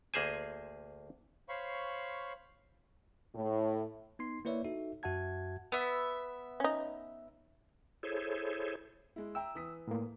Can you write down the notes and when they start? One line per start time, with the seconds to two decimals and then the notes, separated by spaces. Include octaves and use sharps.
0.14 D2 A#3 G#4 C5 G#5
1.49 C5 C#5 F5 B5 C#6
3.35 A2
4.19 B3 D#4 C6 C7
4.45 A#3 E4 B4 C#5 D5 E5
4.64 D#4 F#4 A4 E5
5.03 F#2 F#4 E5 F#5 A5 G#6
5.72 B3 E5
6.60 C#4 D#4
8.03 E4 G#4 A4 C5 C#5
9.16 G#3 E4
9.35 E5 G5 A#5 E6
9.55 E3 D#6 B6
9.88 A2 A#3